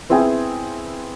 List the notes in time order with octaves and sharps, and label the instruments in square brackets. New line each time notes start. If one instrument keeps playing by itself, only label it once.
[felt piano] B3 C4 E4 G#4 G5 G#5